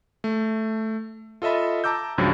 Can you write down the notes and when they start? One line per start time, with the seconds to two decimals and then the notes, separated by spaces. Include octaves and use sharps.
0.24 A3
1.42 F4 A4 D#5 E5 B5
1.84 A5 A#5 D6 E6 G6
2.18 C#2 G2 F3 F#3